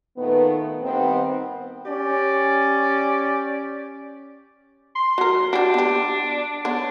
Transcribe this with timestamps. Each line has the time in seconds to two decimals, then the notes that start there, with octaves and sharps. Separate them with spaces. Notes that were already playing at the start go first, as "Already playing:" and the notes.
0.17 A#2 D#3 A3 B3
0.82 G2 D#3 B3 C4
1.86 C#4 G4 D5
4.96 C6
5.18 F#3 A#4
5.53 D4 F#4 G4
5.74 B3 G4
6.65 B3 D4 C#5